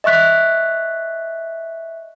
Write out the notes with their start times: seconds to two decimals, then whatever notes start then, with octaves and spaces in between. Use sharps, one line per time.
0.04 D#5 E5 C#6 F#6 B6